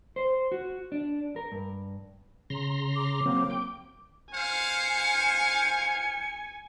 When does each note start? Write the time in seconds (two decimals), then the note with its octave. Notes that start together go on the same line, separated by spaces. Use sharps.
0.16 C5
0.52 F#4
0.92 D4
1.36 A#4
1.52 G2
2.50 C#3 A#5 C6
2.96 D6
3.25 F#3 A#3 C4
3.50 G5
4.33 C5 F5 G#5 C#7